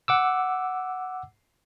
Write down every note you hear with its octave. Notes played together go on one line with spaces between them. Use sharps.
F#5 D6 E6